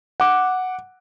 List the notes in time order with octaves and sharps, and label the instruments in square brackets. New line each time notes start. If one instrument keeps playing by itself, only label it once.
[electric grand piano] F#5 D6